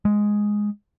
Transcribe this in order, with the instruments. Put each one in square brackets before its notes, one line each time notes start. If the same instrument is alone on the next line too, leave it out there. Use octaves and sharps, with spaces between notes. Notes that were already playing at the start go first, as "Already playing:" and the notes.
[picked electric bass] G#3